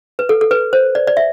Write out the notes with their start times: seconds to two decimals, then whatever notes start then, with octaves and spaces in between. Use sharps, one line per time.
0.19 B4
0.29 A4
0.41 A4
0.51 B4
0.73 C5
0.95 D5
1.07 D5
1.17 E5